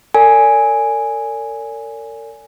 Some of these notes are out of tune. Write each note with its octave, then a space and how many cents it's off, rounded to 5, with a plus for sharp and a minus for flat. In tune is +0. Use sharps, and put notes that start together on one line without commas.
A#4 -45 D5 -40 G#5 +0